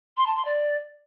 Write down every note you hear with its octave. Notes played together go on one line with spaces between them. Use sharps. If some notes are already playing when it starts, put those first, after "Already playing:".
C6
A5
C6
D5